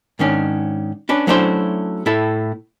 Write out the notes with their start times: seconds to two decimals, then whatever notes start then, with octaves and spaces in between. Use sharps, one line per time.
0.19 G#2 D#3 C#4 D4
1.09 C#4 D4 B4
1.27 F#3 A3 C#4 D4 E4 C5
2.06 A2 E4 A4